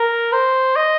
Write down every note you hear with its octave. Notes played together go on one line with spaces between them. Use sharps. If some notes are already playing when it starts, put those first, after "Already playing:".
Already playing: A#4
C5
D#5